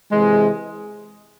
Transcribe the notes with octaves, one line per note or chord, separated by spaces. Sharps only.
C3 E3 G#3